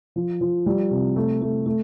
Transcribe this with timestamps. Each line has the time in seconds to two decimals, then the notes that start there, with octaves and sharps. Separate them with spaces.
0.16 F3
0.41 F3
0.66 G3
0.91 C3
1.16 A3
1.42 A3
1.66 A3